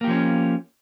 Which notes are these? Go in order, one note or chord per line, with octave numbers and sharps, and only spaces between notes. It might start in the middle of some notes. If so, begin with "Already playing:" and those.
F3 A#3 C#4 G4